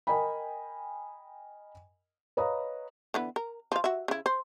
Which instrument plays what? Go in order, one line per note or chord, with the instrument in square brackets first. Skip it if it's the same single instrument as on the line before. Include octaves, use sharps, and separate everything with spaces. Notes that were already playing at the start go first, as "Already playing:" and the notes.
[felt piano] A#4 D#5 G5 G#5 B5
B4 C#5 D#5 F5 A#5 D#6
[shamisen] D3 E3 B3
A#4
F3 F5
F#4 E5
C#3 E4
C5